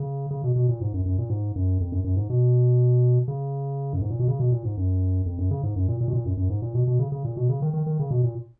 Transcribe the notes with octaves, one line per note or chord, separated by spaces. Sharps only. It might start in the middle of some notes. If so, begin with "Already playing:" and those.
Already playing: C#3
C#3
B2
B2
A#2
G#2
F#2
F#2
A#2
G#2
F#2
F2
F#2
F#2
G#2
B2
C#3
F#2
G#2
A#2
B2
C#3
B2
A#2
G#2
F#2
F2
F#2
C#3
G#2
F#2
A#2
A#2
B2
A#2
F#2
F#2
G#2
A#2
B2
B2
C#3
C#3
A#2
B2
C#3
D#3
D#3
D#3
C#3
B2
A#2